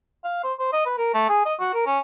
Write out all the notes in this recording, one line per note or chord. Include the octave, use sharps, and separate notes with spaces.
F5
C5
C5
D#5
B4
A#4
A3
G#4
D#5
F#4
A#4
C#4